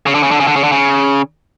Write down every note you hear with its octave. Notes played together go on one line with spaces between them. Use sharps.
C#3
D3
C#3
D3
C#3
D3
C#3
D3
C#3